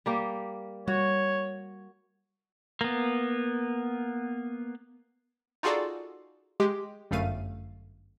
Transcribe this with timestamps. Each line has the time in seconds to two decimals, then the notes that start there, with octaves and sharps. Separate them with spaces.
0.06 G3 A#3 G4
0.88 G3 F#4 C#5
2.81 A#3 B3
5.63 D#4 F4 F#4 G#4 A4 D5
6.60 G#3 G4
7.11 G1 F#2 A3 F5 D#7